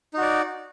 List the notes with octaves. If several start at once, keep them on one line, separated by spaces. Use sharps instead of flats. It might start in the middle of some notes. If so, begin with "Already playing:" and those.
D#4 F#4 D5